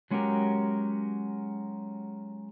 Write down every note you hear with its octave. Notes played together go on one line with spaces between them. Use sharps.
F#3 G#3 C#4 F#4 G4 A#4